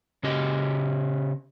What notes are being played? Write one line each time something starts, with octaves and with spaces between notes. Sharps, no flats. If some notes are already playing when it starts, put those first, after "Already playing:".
C#3 C#4 G4 D#5